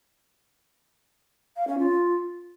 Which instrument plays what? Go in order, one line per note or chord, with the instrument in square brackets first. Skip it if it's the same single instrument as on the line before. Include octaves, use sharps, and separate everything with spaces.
[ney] F5
C#4
F4